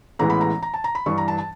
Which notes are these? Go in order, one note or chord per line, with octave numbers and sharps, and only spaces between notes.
A1 A2 E3 G#3 B3 A#5
B5
A#5
A#5
A5
A#5
B5
G2 E3 G3 C#6
A#5
A5
A5